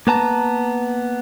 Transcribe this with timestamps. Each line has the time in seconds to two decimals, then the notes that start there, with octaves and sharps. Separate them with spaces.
0.07 A#3 B3 A5 A#5